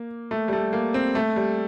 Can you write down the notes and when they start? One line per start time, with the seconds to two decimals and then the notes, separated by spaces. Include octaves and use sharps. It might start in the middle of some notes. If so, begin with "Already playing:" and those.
Already playing: A#3
0.31 A3
0.48 G3
0.53 A3
0.73 A#3
0.94 C4
1.15 A3
1.36 G3